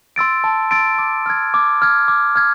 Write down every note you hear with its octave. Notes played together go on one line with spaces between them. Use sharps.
C6 E6 A6 D7
A5
C6 E6 A6 D7
D6
F6 G#6
D6
F6 G#6
D6
F6 G#6